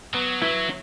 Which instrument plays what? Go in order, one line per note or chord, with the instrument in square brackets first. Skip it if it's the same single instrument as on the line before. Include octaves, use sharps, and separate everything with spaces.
[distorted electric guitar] F#3 [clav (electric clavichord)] B3
[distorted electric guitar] F#3 [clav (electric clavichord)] E4 B4 E5